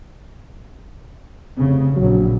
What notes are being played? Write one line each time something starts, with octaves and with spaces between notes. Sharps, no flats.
F1 C#3 C4
A#1 F#3